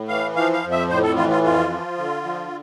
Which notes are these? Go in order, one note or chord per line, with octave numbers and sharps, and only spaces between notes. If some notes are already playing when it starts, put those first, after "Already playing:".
Already playing: A2
E3 F5
F3 F5
F5
F2
E5
A2 C5
A4
E3 F4
F4
F2 F4
F3
D3
F3